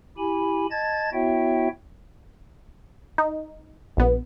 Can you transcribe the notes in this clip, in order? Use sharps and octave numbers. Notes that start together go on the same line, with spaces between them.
E4 G4 G#5 B5
D#5 A5 G#6 A6
B3 E4 F#4 C#5 E5 G5
D#4
A#1 B3